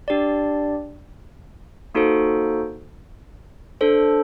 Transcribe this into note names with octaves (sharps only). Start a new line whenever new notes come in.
D4 G4 D5
A#3 D#4 F#4 A4 C5
D4 A4 C5